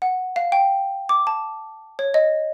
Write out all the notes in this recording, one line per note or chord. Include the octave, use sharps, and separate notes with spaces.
F#5
F5
G5
D6
A5
C#5
D#5